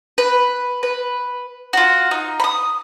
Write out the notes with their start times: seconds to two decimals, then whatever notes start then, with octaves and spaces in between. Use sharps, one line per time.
0.18 B4
0.83 B4
1.73 F4 F#4
2.11 D#4
2.40 B5 D#6